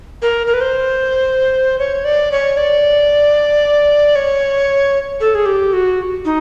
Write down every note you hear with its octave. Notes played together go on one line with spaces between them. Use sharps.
A#4
A#4
B4
C5
C#5
D5
C#5
D5
C#5
A4
G#4
G4
F#4
D#4